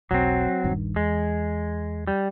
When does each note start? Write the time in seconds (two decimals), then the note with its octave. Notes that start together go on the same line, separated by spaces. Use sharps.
0.11 E1 B1 F#3 C4
0.64 D#1 G2 D#3
0.96 E2 G#3
2.07 G3